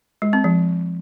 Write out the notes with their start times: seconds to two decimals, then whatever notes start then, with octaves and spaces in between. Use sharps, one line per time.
0.22 G#3
0.33 C4
0.44 F3